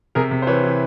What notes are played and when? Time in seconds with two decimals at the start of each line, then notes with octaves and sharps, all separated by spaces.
0.15 C3 G#4 A#4
0.31 C3
0.42 C5
0.47 E3 B4 C#5
0.64 E3